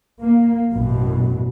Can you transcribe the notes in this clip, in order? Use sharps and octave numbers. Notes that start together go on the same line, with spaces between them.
A#3
A1 F#2 B2